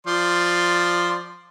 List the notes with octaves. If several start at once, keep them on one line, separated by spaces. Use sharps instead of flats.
F3 D5 C6